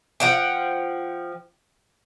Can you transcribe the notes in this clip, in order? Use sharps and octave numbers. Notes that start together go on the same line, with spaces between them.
F3 F#5 G5